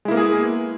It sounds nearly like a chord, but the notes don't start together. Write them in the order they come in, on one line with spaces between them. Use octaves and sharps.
G#3 E4 A#3 B3 G#4